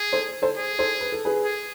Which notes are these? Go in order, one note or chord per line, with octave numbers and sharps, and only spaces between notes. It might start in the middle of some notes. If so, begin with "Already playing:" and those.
Already playing: G#4
A4 C5
A4 C5
G#4
A4 C5
B4
A4
G#4 B4
G#4